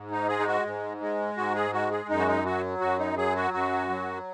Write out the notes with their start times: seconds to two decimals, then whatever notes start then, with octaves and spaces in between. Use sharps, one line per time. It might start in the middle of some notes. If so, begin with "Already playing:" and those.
Already playing: G#2
0.11 D#4
0.28 G#3 G#4
0.39 D#4
0.47 F#4
0.65 G#2
1.01 G#3
1.37 G#2 F#4
1.55 G#4
1.73 G#3 F#4
1.91 G#4
2.09 F#2 D#4
2.19 F#4
2.28 D#4
2.45 F#3 F#4
2.81 F#2 F#4
2.99 D#4
3.17 F#3 G#4
3.36 F#4
3.54 F#2 F#4
3.90 F#3